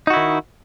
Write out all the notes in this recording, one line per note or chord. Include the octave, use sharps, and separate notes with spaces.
D#3 D#4 E4 F#4